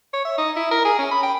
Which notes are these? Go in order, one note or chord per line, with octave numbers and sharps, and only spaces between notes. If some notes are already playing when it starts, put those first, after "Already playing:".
C#5
E5
D#4
E4
A#4
G#4
C#4
B5
G5